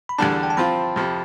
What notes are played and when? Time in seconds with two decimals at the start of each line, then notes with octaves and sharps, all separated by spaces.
0.09 B5
0.18 E2 D3 G3 D4 A5
0.43 G5
0.50 A5
0.57 F3 C4 F4 B5
0.96 F2 C3 F3